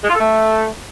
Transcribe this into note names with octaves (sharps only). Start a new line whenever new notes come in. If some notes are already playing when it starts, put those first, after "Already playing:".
G#3
F4
A4
A3